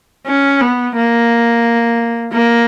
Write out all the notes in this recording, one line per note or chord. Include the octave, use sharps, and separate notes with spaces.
C#4
B3
A#3
A#3